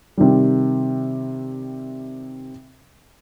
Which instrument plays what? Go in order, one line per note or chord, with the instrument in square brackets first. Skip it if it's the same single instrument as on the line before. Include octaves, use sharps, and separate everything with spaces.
[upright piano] C3 D#3 G3